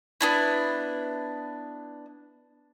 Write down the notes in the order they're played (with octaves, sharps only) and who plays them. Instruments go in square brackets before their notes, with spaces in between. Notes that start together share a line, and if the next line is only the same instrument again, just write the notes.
[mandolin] B3 D4 E4